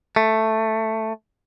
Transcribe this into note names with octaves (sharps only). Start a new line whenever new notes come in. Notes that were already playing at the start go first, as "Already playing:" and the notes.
A3